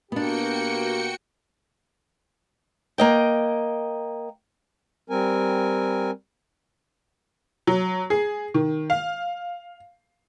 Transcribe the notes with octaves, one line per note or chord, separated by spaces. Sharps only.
B2 A#3 B3 D4 F#4 G4 G5 C#7
A#3 D#5 G5
G3 C4 A#4 G#5
F#3
G#4
D#3
F5